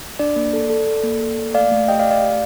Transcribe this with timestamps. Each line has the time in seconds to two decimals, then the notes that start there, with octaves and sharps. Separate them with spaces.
0.19 D4 D5
0.36 A#3
0.53 A4
0.70 A4
0.87 A4
1.04 A#3
1.21 A4
1.38 A#3
1.54 A3 D5 F5
1.72 A3
1.88 G4 D#5 G5
1.99 D5 F5
2.06 A3
2.11 D5 F5
2.22 G4